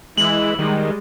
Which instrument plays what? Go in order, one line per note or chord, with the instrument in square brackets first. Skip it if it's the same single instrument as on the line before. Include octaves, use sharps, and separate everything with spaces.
[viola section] E3 E4 [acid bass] G#3 [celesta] F#7
[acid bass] D#3 [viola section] G3 G#3